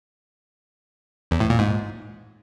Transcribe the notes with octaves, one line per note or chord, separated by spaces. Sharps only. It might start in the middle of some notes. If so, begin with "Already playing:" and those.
E2
A2
A#2
G#2